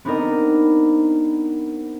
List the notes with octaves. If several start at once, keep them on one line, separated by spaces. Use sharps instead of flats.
B3 C4 D4 D#4 A#4 D#5